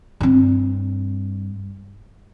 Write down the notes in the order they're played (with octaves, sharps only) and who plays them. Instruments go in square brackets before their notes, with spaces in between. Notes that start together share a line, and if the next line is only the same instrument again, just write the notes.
[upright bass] G2 C4